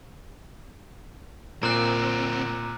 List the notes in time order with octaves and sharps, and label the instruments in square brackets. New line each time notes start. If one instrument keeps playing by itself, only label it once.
[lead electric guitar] D2 C4 [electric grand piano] A#2 [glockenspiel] A#5 F#6